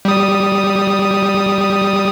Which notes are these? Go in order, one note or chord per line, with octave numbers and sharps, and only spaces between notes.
G3 D#6